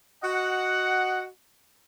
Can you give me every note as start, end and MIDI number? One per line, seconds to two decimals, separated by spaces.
0.23 1.26 66
0.23 1.26 75
0.23 1.26 78